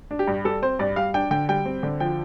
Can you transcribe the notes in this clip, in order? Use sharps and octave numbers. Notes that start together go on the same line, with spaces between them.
D4
G4
G2
G3 A4
C4 C5
G2 D5
G3 F5
D4 G5
D3 G5
G3 G5
C4
D3
F3 G5